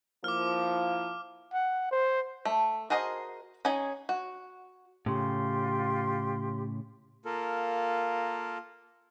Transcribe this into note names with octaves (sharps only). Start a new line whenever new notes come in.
F3 A#3 E4 D6 F6
F#5
C5
A3
F#4 G#4 A#4 C5 D#5
C#4 D#4 G#4 G#5
F#4
A2 C#3 F4 G4 C6
A#3 F4 A4 A#4